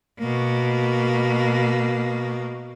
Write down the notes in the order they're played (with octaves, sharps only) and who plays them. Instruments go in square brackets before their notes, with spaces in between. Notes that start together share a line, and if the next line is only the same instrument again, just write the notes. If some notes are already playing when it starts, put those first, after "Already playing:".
[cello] B2 A#3